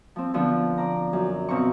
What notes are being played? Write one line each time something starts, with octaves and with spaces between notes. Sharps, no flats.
F3 C4
D3 F3 B3
D5 A#5
F#2
B2 C4 F5 A#5 C#6